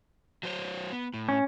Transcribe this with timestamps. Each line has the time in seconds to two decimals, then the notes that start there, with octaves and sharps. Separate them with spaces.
0.43 F#3 C5 C#5
0.92 B3
1.14 A2
1.29 C#4